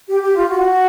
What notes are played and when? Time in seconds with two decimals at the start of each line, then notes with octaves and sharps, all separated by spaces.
0.08 G4
0.22 G4
0.35 F4
0.49 F#4